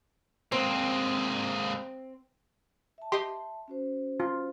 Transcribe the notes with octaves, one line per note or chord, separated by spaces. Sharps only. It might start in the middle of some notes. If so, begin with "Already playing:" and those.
G#3 A#3 C4
E5 A5
G4 D#5 C6
C#4 F#4 C5
F4